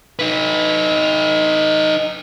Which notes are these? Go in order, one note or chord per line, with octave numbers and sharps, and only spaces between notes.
D#4 B4